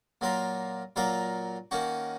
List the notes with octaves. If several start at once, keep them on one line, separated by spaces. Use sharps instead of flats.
A#2 F#3 A#3 F4 A#4
A#2 F#3 A#3 F4 A#4
D#3 A#3 C#4 F#4